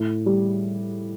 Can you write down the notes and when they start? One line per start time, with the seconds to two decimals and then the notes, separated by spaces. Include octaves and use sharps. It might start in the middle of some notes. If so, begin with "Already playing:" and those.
Already playing: A2
0.26 G3